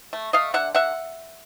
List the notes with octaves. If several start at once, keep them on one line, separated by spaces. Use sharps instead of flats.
A3
A3 D#5 F5
D3 E5 F#5
D3 E5 F#5